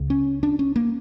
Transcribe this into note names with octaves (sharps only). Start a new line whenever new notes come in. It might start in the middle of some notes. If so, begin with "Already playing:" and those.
Already playing: C#2 C#3
C#4
D4
C#4
A#3